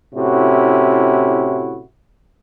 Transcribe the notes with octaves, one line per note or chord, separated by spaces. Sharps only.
A2 C3 C#4 E4 F#4